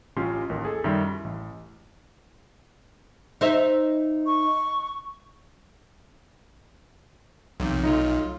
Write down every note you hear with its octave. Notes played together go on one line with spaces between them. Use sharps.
A1 F#3 C#4 F4 G4 C6
A1 D#2 A#4
G#4 A4
F#2 D#3 G3 E5 C6
E4
A1
D#4 C5 E5
C#6
B1 F2 C3 D#3
F#3 A3 D#4 F4